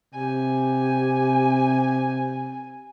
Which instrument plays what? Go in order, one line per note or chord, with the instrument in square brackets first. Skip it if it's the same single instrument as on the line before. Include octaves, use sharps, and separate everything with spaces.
[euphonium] C3 [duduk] G4 [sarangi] G#5